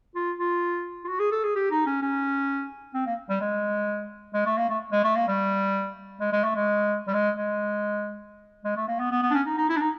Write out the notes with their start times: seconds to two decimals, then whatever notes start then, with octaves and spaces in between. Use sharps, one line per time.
0.15 F4
0.39 F4
1.04 F4
1.08 F#4
1.19 G#4
1.32 A4
1.43 G#4
1.55 G4
1.71 D#4
1.86 C#4
2.02 C#4
2.94 C4
3.06 A#3
3.29 G3
3.41 G#3
4.33 G#3
4.46 A3
4.57 A#3
4.69 A3
4.92 G#3
5.04 A3
5.15 A#3
5.28 G3
6.20 G#3
6.32 G#3
6.44 A3
6.56 G#3
7.08 G3
7.14 G#3
7.37 G#3
8.65 G#3
8.76 A3
8.88 A#3
9.00 B3
9.11 B3
9.22 B3
9.31 D4
9.34 C#4
9.46 D#4
9.58 D#4
9.70 E4
9.77 D4
9.81 D#4